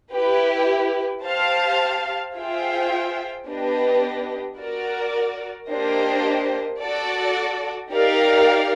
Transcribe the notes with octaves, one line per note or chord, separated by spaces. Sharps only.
E4 G4 B4
G4 C5 F5 A5
F4 G#4 C5 E5 G5
B3 D4 G4 B4 D#5
F#4 A#4 D5
A#3 D4 G4 C5 D#5
F#4 A4 D5
D#4 G4 A#4 D5 F5